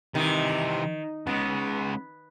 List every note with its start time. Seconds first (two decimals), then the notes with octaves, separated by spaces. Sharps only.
0.15 C3 D#3 E3
1.27 C#3 G#3 B3